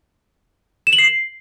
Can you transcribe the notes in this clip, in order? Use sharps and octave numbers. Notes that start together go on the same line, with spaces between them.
E7
F#7
C7